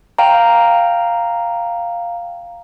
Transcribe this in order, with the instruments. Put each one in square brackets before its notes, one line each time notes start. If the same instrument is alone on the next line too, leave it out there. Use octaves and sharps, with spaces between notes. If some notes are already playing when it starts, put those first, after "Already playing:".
[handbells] F5 G5 A#5